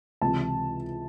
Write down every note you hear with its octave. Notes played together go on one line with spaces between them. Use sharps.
C#2 C3 E3 A5